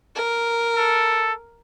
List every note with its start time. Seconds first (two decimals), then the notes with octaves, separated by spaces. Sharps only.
0.15 A#4
0.76 A4